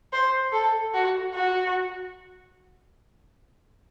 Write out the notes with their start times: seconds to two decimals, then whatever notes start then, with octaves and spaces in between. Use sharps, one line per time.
0.13 C5
0.53 A4
0.94 F#4
1.34 F#4